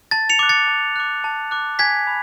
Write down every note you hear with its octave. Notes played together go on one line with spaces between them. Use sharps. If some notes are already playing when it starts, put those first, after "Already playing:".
A5 A6
C#7 F7
D6 F#6
A6 C#7
A5
D6 F#6
A5
D6 F#6
G#5 G#6 B6
B5